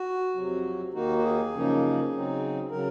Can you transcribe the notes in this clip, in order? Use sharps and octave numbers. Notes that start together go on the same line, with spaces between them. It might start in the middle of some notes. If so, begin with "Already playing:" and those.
Already playing: F#4
F2 C3 F#3
D#2 D#3 A#3 D#4 F#4
F#4
G#4
F#2 C#3 F3 A#3 D#4
C#3 F#3 C4 D#4
C#3 F#3 A#4